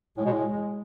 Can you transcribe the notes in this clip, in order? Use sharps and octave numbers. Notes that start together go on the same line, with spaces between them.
A2 G#3
B2
A2